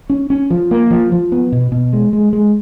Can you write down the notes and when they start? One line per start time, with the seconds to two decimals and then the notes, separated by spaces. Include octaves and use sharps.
0.10 C#4
0.30 C#4
0.50 F3
0.71 A#3
0.90 F3
1.12 F3
1.32 B3
1.52 B2
1.72 B2
1.93 G#3
2.13 G#3
2.33 G#3